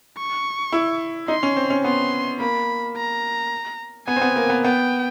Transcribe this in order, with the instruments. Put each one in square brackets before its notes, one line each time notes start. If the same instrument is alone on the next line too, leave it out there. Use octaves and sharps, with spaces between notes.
[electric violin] C#6
[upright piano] E4
[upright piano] D#4 [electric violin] C6
[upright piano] C#4
C4
C#4
[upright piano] B3 [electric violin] C6
[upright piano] A#3 [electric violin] B5
[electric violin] A#5
[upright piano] B3 [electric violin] G#5
[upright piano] C4
B3
A#3
B3
[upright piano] B3 [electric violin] G5